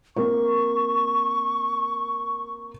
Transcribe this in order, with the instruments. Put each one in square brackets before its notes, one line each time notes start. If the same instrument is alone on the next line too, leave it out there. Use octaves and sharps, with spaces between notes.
[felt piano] A#3 C4 A#4 [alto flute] C#6